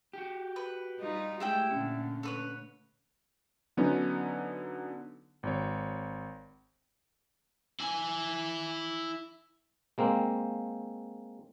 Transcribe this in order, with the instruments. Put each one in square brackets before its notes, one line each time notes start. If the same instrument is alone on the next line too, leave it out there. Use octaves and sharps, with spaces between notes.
[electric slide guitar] F#4 G4
[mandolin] B4
[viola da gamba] G3 D#4 F4
[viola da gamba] G#3 A3 [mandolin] E4 E5 G5 [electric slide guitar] G4
[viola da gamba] A#2 D3 A3 [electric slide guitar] C#4
[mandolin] A4 B4 C#5
[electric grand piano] D3 F#3 B3 C#4 D#4
G#1 C#5
[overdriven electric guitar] E4 G#5
[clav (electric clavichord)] G#3 A#3 C4